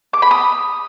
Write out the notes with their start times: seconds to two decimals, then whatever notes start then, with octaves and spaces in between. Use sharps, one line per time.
0.13 D6
0.22 B5
0.31 D#6